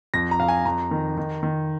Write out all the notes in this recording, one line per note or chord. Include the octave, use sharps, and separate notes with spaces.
F2 A#6
A#5
F2 F5
G#5
F2 A#5
D#3
D#3
D#3